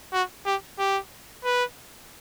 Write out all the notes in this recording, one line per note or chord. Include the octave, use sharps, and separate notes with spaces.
F#4
G4
G4
B4